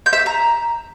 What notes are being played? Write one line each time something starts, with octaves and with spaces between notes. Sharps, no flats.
G6
E5
E6
A#5